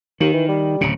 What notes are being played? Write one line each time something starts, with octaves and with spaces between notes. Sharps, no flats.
D#2 D#3
E3
G3
D1 C#3